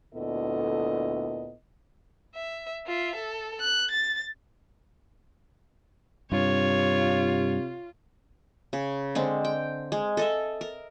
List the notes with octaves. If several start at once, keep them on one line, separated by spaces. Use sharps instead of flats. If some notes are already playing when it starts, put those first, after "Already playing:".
D2 A#2 B3 E4 A4 D#5
E5
F4 E5
A4
F#6
A6
G2 C3 F4 C#5
C#3
D3 G#3 C4
G5
G#3
A4 D#5 E5
A#4